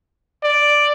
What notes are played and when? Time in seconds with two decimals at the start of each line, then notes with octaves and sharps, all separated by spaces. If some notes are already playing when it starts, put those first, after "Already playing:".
0.43 D5